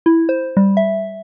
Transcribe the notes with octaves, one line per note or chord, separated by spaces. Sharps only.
E4
C5
G3
E5